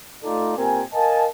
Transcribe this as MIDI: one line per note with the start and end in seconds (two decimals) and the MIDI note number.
0.23 0.53 57
0.23 0.53 63
0.23 0.53 65
0.23 0.53 69
0.23 0.53 74
0.56 0.83 46
0.56 0.83 60
0.56 0.83 67
0.56 0.83 70
0.56 0.83 80
0.93 1.26 70
0.93 1.26 75
0.93 1.26 77
0.93 1.26 80
0.93 1.26 81